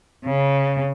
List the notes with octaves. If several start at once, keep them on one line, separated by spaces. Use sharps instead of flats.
C#3